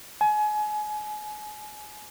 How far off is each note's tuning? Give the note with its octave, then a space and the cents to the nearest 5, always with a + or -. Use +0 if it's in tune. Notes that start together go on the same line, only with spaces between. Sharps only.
G#5 +30